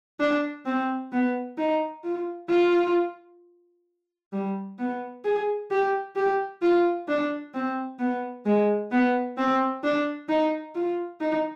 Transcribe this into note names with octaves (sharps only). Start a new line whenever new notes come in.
D4
C4
B3
D#4
F4
F4
G3
B3
G#4
G4
G4
F4
D4
C4
B3
G#3
B3
C4
D4
D#4
F4
D#4